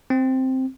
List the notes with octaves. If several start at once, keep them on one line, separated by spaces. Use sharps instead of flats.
C4